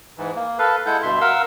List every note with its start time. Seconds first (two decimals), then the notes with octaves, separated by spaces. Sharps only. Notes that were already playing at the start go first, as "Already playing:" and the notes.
0.18 G#2 E3
0.36 A#3
0.59 A4 B4 F5
0.86 G#3 E4 A4 F#5 G6
1.03 G2 B2 E5 C6
1.21 A#4 F5 F#5 E6